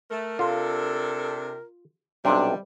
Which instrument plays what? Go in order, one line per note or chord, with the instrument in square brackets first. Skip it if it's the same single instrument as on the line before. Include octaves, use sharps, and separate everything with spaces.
[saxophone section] A3 [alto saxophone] A#4
[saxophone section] C3 D4 A4 [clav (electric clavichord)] F4
[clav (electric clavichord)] B1 C3 [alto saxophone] G3 [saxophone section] D4